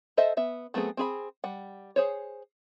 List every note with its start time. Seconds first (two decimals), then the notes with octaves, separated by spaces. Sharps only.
0.17 A4 C5 D#5 E5
0.37 B3 E5
0.74 F#3 A3 B3 C4 G#4
0.97 C4 G#4 B5
1.44 G3 F#5
1.96 G#4 C5 C#5